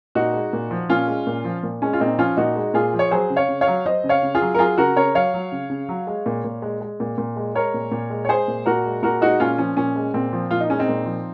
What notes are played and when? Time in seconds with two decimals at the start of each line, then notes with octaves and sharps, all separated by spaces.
0.15 A#2 D#4 F#4
0.34 G#3
0.53 A#2
0.71 F3
0.89 A#2 C#4 F4
1.07 G#3
1.27 A#2
1.45 F3
1.63 A#2
1.82 G#3 C#4
1.93 F4
2.00 A#2 C4 D#4
2.19 F3 C#4 F4
2.37 A#2 D#4 F#4
2.56 G#3
2.74 A#2 F4 G#4
2.93 F3
2.99 C#5
3.11 F#3 G#4 C5
3.30 C#3
3.36 C#5 F5
3.49 C#3
3.61 C#5 F5
3.67 F#3
3.86 F#3 C5 D#5
4.04 C#3
4.09 C#5 F5
4.23 C#3
4.35 F4 G#4
4.41 F#3
4.55 A#4
4.59 F#3 F4 G#4
4.78 C#3 F#4 A#4
4.96 C#3 A#4 C#5
5.15 F#3 C#5 F5
5.34 F#3
5.52 C#3
5.70 C#3
5.89 F#3
6.07 G#3
6.26 A#2
6.44 A#2
6.62 G#3
6.81 G#3
7.00 A#2
7.18 A#2
7.36 G#3
7.55 G#3 A#4 C#5
7.74 A#2
7.92 A#2
8.10 G#3
8.25 C#5
8.29 G#3 G#4 C5
8.48 A#2
8.66 A#2 F#4 A#4
8.85 G#3
9.03 A#2 F#4 A#4
9.21 G#3 D#4 F#4
9.40 A#2 C#4 F4
9.58 F3 C#4
9.77 A#2 C#4
9.96 G#3
10.14 A#2 C4
10.33 F3
10.51 A#2 F4
10.60 D#4
10.70 G#3 C#4
10.79 C4 D#4
10.88 A#2
11.06 F3